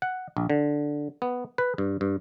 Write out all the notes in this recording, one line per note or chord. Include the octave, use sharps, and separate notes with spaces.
F#5
A#1
D3
B3
B4
G2
G2